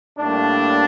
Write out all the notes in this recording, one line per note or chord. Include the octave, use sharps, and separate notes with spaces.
A2 G3 A#3 D4